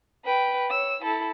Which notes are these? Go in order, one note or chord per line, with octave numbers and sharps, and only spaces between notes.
B4 G5
C#5 E6
E4 A4